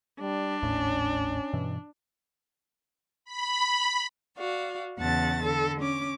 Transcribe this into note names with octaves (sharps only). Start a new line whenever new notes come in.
G3 D4
G#1 D#2 A2 C#4
G2 B2 E3
B5
F#4 D5 F5
E2 C#3 F#5 A5 A6
D3 A4
C#4 D6